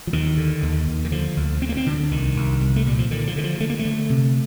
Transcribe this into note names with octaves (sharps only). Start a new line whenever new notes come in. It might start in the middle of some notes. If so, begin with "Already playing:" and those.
F3
D#2 D#3
D3
D#2
D#2
D#3
D3 F3
D2
D2 C4
A#3
C4
D2 D3
C2 D#3
C2
C2
A3
A#2 G3
F3
D3 D#3
F3
D3 D#3
F3
D3 A3
A#3
A3
D3
C3